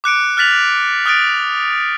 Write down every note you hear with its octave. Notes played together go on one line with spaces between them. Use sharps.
D6 F#6 C#7 D7
F6 F#6 A6 B6 F7 F#7
D#6 F6 F#6 A6 D7